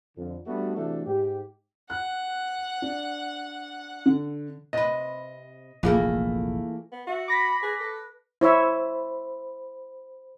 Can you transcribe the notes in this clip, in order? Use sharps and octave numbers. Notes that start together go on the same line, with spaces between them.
F2 D3
G3 A3 B3 D4 F#4
C3 E3 A3 D4 F#4 A4
G#2 G4
F#5 F#6
D4
D3
C3 B4 D#5
F1 A#1 E3 A3 A#3 F4 G#4
B3
F#4 E5
B5 D6 A#6 B6
G#4 B4
A4
E4 C5 C#5 E5 B5